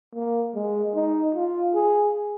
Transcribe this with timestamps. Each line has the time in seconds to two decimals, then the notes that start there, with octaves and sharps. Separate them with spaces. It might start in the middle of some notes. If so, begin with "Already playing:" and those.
0.14 A#3
0.55 G#3
0.95 D#4
1.35 F4
1.75 G#4